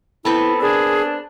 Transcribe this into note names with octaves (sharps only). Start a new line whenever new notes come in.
B3 C4 E4 A4 B4
D4 G#4 A#4